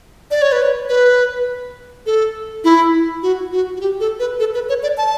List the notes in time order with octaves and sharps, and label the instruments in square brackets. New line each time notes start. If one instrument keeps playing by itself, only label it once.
[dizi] D5
C#5
B4
C#5
B4
A4
E4
F#4
F#4
F#4
G4
A4
B4
A4
B4
C#5
D5
A5